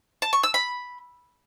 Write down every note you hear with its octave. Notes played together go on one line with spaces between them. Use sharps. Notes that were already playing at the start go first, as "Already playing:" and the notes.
A5
C#6
E6
B5